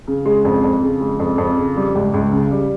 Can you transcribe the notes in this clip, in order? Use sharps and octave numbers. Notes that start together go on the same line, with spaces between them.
C#3
G#3
F2
F2
C#3
G#3
F2
F2
C#3
G3
C#2
C#2
C#3
G3